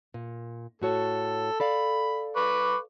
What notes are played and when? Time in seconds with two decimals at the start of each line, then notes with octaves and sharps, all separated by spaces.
0.14 A#2
0.82 A2 F#4 A4 C#5
1.60 A4 D5 F5 B5
2.36 B4 C#6 D6